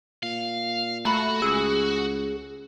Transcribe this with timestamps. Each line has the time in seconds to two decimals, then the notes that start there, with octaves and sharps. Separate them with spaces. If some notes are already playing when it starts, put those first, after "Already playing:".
0.23 A#2 F5
1.05 A3 F#4 A#5 B5
1.42 C#2 G#4 C#6 E6